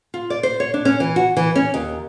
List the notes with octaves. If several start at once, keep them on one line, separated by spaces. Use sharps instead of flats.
F4
D5
C5
C#5
D4
C#4
E3
F#4
E3
C#4
D#2